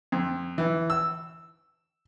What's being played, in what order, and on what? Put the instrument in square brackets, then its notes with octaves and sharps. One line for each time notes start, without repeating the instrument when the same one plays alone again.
[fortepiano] F2
E3
E6